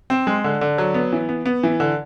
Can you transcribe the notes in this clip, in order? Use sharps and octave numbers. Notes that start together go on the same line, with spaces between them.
C4
G#3
D3
D3
F#3
B3
E3
B3
B3
E3
D3